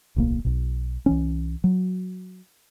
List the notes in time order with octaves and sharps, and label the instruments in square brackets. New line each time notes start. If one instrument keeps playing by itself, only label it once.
[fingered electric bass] D1 B1 A#3
B1 B2
C2 E3 C#4
F#3